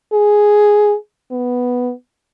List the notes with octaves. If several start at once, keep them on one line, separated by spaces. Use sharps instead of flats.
G#4
B3